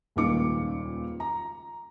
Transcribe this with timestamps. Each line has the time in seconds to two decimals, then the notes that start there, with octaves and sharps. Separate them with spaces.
0.16 D#1 C#2 A#2 D#3 D6 C#7
1.20 A#5